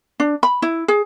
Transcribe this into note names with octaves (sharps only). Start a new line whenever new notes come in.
D4
B5
E4
G#4